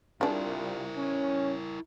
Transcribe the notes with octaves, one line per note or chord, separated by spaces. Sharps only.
C2 D4 E4 F4 G#4 A#4
C#4